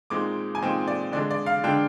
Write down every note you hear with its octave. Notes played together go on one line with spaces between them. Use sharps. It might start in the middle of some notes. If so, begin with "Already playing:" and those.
A#2 G#3 C4 D#4 D6
G#5
A#2 G#3 C4 D#4 G5
D5
D3 G#3 D4 D5
D5
F5
D3 G#3 D4 G5